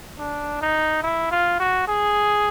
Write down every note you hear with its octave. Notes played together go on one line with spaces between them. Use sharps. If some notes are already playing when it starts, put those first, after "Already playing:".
D4
D#4
E4
F4
F#4
G#4